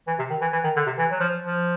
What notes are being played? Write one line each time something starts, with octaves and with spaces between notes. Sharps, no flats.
E3
C3
D#3
E3
E3
D#3
D3
C3
E3
F#3
F3
F3